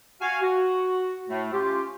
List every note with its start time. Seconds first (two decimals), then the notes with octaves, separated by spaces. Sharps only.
0.21 F#4 F5 G#5
0.42 F#4
1.29 A2 A3
1.53 C#4 F4 G4